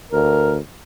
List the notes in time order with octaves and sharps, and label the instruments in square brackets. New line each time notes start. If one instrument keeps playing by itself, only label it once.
[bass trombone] D2 [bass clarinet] A#4